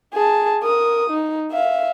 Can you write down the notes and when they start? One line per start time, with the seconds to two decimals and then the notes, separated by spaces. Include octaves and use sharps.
0.14 G#4 A5
0.63 A#4 D#6
1.10 D#4
1.52 E5 F5